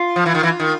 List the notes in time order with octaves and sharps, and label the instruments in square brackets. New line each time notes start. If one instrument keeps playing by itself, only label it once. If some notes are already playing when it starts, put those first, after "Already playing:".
Already playing: [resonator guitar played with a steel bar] F4
[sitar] F3
E3
D#3
E3
D#3